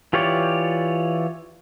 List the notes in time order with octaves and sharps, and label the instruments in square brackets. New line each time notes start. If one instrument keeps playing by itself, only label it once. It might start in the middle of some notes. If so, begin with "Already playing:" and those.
[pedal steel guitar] E3 F4 G4 C#5 D5